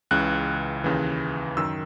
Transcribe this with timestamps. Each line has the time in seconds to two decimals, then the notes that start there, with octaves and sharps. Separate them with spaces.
0.11 C#2 C#3 E3 F#6
0.84 D#2 C#3 E3
1.57 F#2 D#3 E6